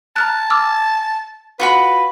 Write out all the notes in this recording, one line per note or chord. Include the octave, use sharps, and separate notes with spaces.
A5 A#5 F6 F#6
D6 E6 F6
F4 F#4 B4 B5